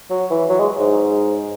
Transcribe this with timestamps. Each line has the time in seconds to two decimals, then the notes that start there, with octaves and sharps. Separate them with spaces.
0.11 F#3
0.31 E3
0.50 F#3
0.60 G#3
0.79 G#2